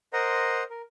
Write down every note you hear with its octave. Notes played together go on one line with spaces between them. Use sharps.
A#4 C5 D#5 F#5 A#5 C6
A#4